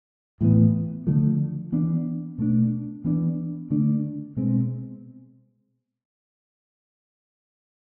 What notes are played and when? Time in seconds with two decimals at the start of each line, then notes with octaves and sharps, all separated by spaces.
0.41 A2 E3 B3
1.07 D3 F3 A3
1.72 E3 B3 D4
2.38 B2 A3 D4
3.04 E3 B3 D4
3.70 D3 A3 D4
4.37 B2 G#3 C4